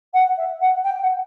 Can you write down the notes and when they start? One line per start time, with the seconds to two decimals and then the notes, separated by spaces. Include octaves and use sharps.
0.13 F#5
0.37 E5
0.61 F#5
0.84 G5
1.02 F#5